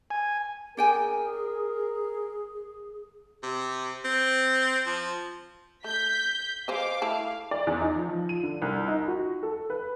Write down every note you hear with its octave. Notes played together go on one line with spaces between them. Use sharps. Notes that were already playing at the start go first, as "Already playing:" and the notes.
G#5
D4 G#4 A#4 G5 G#5
C3
C4
F3
A3 G6 B6
G#3 C5 D#5 F5 D6
A3 E4 F5 A5
D5
E2
D#4
F3
F3
D#7
D3
C2
D#4
F#4
A4
B4